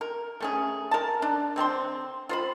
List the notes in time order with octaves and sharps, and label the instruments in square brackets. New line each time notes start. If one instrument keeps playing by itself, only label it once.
[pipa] A#4
A3 C#4 G#4
A#4 A5
D4
D3 C4 A5 C6
F4 C5 B5